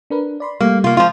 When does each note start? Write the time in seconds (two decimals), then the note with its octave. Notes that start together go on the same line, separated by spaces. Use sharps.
0.10 D4 A#4 B4
0.40 D5 B5 C6
0.61 G3 A3 A#3
0.84 C3 A#3 F4
0.97 F3 G#3 F4